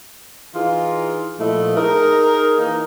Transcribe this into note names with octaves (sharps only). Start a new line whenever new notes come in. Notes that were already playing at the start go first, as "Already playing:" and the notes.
E3 D#4 F4 G#4 F5
A#2 F3 A3 E4 D#5
D#4 G#4 A#4
E3 A#3 D#4 A#4